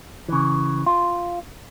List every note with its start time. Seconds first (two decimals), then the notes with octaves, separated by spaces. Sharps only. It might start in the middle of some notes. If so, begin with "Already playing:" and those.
0.28 C#3 E3
0.86 F4